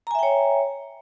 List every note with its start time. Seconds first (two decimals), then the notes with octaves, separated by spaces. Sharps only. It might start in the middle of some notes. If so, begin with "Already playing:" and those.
0.07 A#5
0.11 G#5
0.15 E5
0.19 G5
0.23 C#5